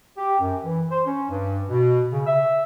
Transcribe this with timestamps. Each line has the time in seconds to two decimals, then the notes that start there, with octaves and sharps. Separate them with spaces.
0.17 G4
0.39 F#2
0.63 E3
0.91 C5
1.06 C#4
1.30 G2
1.69 B2
2.12 C#3
2.27 E5